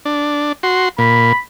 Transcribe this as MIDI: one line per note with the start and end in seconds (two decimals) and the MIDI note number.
0.05 0.52 62
0.63 0.89 66
0.63 0.89 84
0.98 1.32 46
0.98 1.36 83